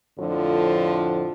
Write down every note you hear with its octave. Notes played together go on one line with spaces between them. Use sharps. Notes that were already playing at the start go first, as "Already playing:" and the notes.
F2 A2 D3 F3